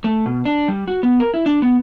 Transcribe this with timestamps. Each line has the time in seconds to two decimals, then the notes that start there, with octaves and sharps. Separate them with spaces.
0.04 A3
0.26 B2
0.45 D4
0.68 G3
0.88 F#4
1.03 B3
1.20 A#4
1.34 E4
1.46 D4
1.62 B3